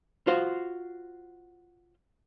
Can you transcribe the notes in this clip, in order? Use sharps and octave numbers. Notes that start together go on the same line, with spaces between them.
F4 F#4 C5